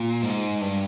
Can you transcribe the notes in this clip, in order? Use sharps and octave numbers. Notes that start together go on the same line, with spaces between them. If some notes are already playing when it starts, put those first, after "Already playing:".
Already playing: A#2
G#2
G2